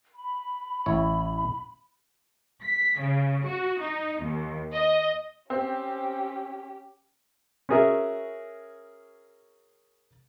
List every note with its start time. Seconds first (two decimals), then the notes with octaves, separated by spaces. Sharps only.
0.15 B5
0.86 A1 E4 C#5
2.63 B6
2.99 C#3
3.44 F#4
3.80 D#4
4.21 D#2
4.73 D#5
5.50 C4 C#4 G4
7.69 C#4 F#4 G#4 A#4 E5